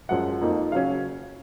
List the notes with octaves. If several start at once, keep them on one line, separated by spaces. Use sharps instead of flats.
F#2 F3 G#3 C#4 F#5
F2 F3 A#3 D#4
C#3 F#3 C#4 F5